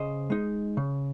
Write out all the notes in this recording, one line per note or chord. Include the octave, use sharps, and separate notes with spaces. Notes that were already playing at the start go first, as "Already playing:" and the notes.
Already playing: C#3 C5 D#5
G#3 D#4
C#3